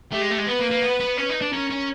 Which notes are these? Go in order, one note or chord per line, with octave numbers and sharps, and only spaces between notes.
A3 G4
G#3
A3
G#3
B3 B4
A#3
A#3
B3
B3
C#4 B4
D#4
D4
C#4 A#4
C#4